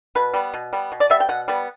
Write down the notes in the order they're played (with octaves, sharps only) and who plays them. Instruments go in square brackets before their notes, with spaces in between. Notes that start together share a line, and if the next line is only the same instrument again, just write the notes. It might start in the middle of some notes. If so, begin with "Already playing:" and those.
[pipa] B2 B4
G3 B3
B2
G3 B3
B2
D5
G3 B3 E5
G5
B2 F#5
G3 B3